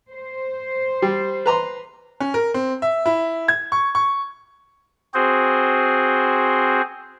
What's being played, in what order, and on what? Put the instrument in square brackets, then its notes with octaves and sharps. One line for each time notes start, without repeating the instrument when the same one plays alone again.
[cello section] C5
[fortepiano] G3
B4 A#5 C6
[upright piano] C#4
A#4
C4
E5
E4
G#6
C#6
C#6
[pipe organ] C4 F#4 G#4 C5